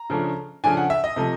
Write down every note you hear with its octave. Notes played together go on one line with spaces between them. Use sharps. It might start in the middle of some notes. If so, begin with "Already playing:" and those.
Already playing: A#5
C#3 F3 A3 D4
C#3 F3 A3 D4 G#5
F#5
E5
D#5
C3 F3 A3